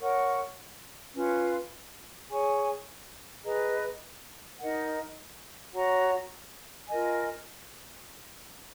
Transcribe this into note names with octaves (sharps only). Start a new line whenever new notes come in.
A#4 C#5 F#5 C#6
C#4 F4 B4
G#4 C#5 G#5 C#6
G#4 B4 D#5 A#5
D#4 A#4 D#5 F#5
F#4 C#5 F#5 A#5
F4 A#4 D#5 G#5